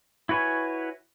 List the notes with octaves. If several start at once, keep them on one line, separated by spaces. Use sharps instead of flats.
E4 F#4 B4 C#5 G#5